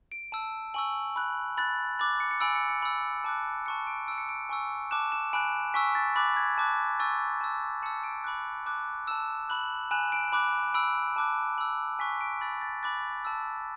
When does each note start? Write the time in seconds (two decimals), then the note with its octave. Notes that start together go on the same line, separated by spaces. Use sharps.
0.12 D7
0.32 A5 E6
0.74 G#5 C#6 E6 F#7
1.16 B5 F#6
1.57 B5 F#6 A6
1.99 B5 D6 F#6 A6
2.20 C#7
2.31 C#7
2.41 G#5 B5 E6 D7
2.55 C#7
2.69 C#7
2.82 B5 E6
3.24 A5 D6 F#6
3.66 A5 C#6 F#6 C#7
3.87 D7
4.07 A5 E6 D7
4.18 C#7
4.29 D7
4.49 G#5 C#6 E6
4.91 A5 D6 F#6 E7
5.12 E7
5.33 G#5 B5 F#6 D7
5.74 G#5 C#6 E6 B6
5.95 A6
6.16 B5 D6 F#6 A6
6.37 G#6
6.58 A5 D6 F#6
7.00 G#5 C#6 E6 A6
7.41 A5 E6
7.82 A5 E6 C#7
8.04 D7
8.24 B5 D6 F#6
8.66 A5 D6 F#6
9.07 A5 E6 E7
9.49 B5 F#6 F#7
9.91 G#5 B5 F#6 E7
10.12 D7
10.32 B5 D6 F#6
10.74 B5 E6 D7
11.16 A5 D6 F#6
11.58 B5 E6
11.99 G#5 C#6 F#6 B6
12.21 D7
12.41 B5 E6 A6
12.61 A6
12.83 B5 D6 F#6 A6
13.25 A5 E6